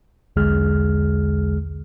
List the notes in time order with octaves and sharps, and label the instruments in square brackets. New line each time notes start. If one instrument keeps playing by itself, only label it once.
[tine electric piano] B1 E2 D3 G#3 G#4 F6